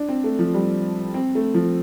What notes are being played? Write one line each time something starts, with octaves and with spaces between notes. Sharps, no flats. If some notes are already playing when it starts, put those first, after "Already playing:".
Already playing: D4
C4
A3
F3
G3
C4
A3
F3